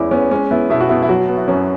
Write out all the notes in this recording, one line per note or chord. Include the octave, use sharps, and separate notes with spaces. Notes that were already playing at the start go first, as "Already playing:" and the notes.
Already playing: E2 E3 G#3 C#4 E4
B3 C#4
G#3 C#4
B3 E4
B2 E4
F#4
B2 E4
E4
F#3 F#4
B3
E4
F#2 C#4